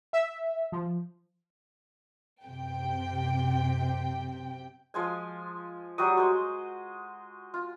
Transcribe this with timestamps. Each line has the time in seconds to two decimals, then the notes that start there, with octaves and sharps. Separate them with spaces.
0.13 E5
0.72 F3
2.44 F#2 C3 G5
4.94 F3 G#3 G#5
5.98 F#3 G3 F#4 D#6
6.17 G#3 C5
7.54 F4